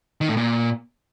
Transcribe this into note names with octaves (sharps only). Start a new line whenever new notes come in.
D#3
A2
A#2